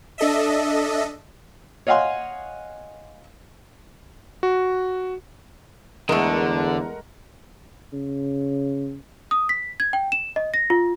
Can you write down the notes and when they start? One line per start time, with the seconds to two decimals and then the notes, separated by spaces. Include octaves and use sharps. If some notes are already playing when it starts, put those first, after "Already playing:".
0.18 D4 A4 D#5 E5
1.87 C#5 D#5 F5 F#5 G#5 C6
4.43 F#4
6.09 E2 D3 G#3 A3 A#4 F#5
7.93 C#3
9.31 D#6
9.49 B6
9.80 G#6
9.93 G5
10.12 E7
10.36 D#5
10.54 A#6
10.70 F4